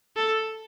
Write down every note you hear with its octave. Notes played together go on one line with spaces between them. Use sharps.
A4